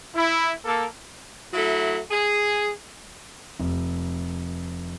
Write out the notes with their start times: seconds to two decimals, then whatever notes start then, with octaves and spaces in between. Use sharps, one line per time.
0.15 E4
0.65 A#3 A4
1.54 F#3 A3 E4
2.10 G#4
3.59 F1